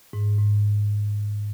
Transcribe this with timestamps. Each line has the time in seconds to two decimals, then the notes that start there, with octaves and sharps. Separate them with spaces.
0.13 G#2
0.39 G#2